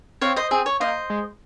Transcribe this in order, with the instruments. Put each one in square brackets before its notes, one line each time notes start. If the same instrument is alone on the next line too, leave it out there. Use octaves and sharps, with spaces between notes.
[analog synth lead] C4 [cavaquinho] C#5 F5
[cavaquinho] C5 D#5
[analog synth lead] C4 [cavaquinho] G#4
[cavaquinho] C#5
[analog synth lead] A#3 [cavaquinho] C5 D#5
[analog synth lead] G#3